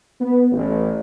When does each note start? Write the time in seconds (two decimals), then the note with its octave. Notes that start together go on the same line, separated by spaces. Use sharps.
0.20 B3
0.52 A1